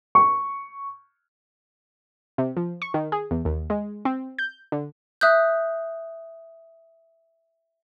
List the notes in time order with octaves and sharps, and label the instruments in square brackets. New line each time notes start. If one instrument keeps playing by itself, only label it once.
[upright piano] C#6
[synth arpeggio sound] C3
F3
C#6
D#3
G#4
E2
D#2
G#3
C4
G6
D3
[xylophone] E5 D#6 F#6 G6